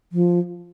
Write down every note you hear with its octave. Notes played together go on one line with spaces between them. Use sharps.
F3